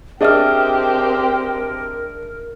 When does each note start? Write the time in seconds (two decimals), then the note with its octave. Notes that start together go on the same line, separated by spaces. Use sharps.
0.21 C4 D4 G4 G#4 A#4 D#5 E5 F6